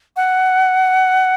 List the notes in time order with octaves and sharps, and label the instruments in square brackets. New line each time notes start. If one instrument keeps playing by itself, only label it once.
[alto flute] F#5